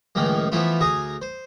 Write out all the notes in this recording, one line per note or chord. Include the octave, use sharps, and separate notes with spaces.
C#2 A2 D#3 F3 G#3 A#3
E3 F3 A3 B3 E4 F4
D2 G#4 A#5 D#6
C5